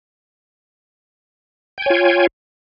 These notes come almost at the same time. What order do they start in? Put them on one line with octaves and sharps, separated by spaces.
G5 G#5 C#5 F4